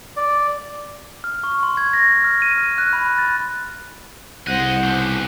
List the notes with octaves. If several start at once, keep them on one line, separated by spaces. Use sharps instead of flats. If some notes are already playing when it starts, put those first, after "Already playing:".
D5
F6
C#6
C6
G#6
A#6
F6
D#7
F6
F#6
B5
A6
C2 C#3 C5 D#5 F#5 F#6 G6
B1